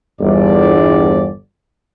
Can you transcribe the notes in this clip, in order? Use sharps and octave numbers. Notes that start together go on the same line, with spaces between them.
G1 E2 D5